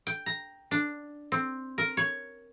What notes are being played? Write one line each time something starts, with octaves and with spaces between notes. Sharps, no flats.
G5
A#5
D4
C4
A#4
C#5